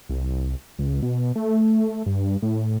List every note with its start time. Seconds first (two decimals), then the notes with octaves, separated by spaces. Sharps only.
0.09 C2
0.79 C#2
1.02 B2
1.35 A3
2.06 G2
2.42 A2